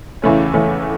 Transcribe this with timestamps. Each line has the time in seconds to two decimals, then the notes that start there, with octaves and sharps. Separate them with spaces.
0.22 E2 C#3 E3 A3 C#4
0.54 E2 C#3 E3 A3 C#4